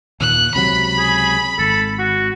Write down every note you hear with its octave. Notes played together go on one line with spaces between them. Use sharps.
D#2 A#2 A#3 F#6
C#2 C3 F#3 B5
G#4
G#1 A4
F#4